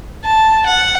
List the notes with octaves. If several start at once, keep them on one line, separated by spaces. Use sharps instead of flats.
A5
F#5